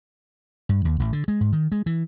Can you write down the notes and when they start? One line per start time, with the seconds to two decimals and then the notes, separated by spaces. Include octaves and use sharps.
0.69 G2
0.85 D#2
1.00 A1
1.13 D3
1.28 G#3
1.41 G#2
1.53 D#3
1.72 G#3
1.86 E3